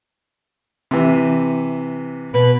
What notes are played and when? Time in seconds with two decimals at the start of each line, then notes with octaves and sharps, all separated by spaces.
0.91 C3 E3
2.34 B2 B4